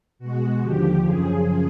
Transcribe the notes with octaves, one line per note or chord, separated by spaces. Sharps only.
B2 G#3 F#4
D#2 D3 F3 G4
F#2 C#3 F3 G#4